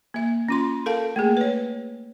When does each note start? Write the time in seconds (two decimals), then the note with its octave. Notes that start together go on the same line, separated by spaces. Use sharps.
0.14 A#3 E5
0.49 C#4 F4 C6
0.86 A4 A#4 F5 A5
1.16 A3 A#3 G#4
1.37 B4 C#5